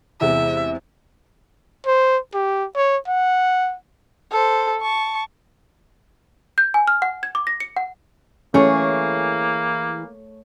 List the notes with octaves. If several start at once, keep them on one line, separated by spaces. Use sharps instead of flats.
E2 C3 G#3 E5
C5
G4
C#5
F#5
A4 C5
A5 C#6
G6
G#5
F6
F#5
G#6
D6
A#6
C#7
F#5
E3 A3 A#3 C#4 E4 G#4 C#5